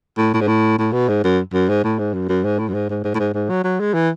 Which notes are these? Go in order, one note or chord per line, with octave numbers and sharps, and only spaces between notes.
A2
A2
G#2
A2
A2
B2
G#2
F#2
F#2
G#2
A2
G#2
F#2
F#2
G#2
A2
F#2
G#2
G#2
G#2
A2
G#2
G#2
F#3
F#3
G#3
E3